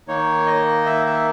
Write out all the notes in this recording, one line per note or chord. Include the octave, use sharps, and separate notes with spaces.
D#3 A#3 D#4 C#5
D#5
E5
E5